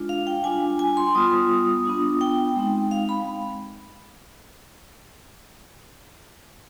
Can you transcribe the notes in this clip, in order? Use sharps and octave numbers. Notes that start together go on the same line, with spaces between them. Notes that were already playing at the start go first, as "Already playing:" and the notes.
Already playing: G#3 D4 F4
F5
G5
G3 D4 F4 G#5
G#5
C6
G3 B3 F4 D#6
B3 D4 F4
G5
G#3 C4 D#4
F5
B5